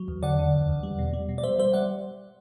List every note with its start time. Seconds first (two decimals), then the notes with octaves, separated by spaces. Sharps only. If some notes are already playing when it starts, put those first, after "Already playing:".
Already playing: F#3
0.08 E2
0.23 D3 D5 F#5
0.39 D3
0.53 E2
0.69 E2
0.83 G3
0.99 B2
1.13 G3
1.29 B2
1.38 D5
1.43 G3 C5 E5
1.59 G3 C5 E5
1.73 G3 D5 F#5